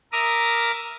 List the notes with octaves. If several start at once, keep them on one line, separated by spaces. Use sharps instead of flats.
A#4 E5 A#5 D6 D#6 F6